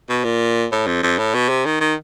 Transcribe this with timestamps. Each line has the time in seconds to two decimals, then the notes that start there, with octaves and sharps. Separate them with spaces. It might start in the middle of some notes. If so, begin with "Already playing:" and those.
0.09 B2
0.24 A#2
0.72 A2
0.87 F2
1.03 F2
1.18 A2
1.34 B2
1.49 C3
1.65 D#3
1.81 D#3